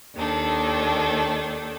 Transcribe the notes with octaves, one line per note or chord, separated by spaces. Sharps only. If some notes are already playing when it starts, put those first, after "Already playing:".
D#2 D#3 D4 A4